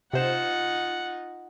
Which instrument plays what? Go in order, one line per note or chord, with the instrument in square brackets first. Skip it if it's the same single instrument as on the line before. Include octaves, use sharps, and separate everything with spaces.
[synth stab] C3 C5 E7 [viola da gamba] D#4 F4 [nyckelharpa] F#5